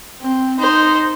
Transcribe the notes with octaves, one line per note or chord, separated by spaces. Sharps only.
C4
D#4 C5